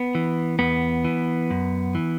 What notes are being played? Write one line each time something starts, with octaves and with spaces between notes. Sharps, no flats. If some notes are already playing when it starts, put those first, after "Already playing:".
Already playing: B3
E3
E2 B3
E3
F#2
E3